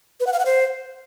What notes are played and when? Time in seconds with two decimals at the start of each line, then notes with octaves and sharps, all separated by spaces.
0.20 B4
0.27 F#5
0.33 F5
0.39 F#5
0.46 C5